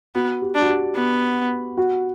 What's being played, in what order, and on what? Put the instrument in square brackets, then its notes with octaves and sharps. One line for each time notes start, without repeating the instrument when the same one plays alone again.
[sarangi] B3 [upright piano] F#4
[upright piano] G4
[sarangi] D4
[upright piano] F#4
G4
[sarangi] B3
[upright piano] F#4